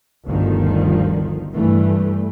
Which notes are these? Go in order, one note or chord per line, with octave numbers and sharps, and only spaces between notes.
G1 D2 D3 D#3 F3
G2 E3 A3